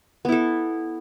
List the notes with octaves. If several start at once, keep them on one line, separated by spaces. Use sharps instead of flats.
B3 E4 A4